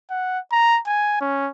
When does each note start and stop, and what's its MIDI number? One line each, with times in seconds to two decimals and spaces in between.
0.11 0.39 78
0.52 0.79 82
0.87 1.18 80
1.21 1.49 61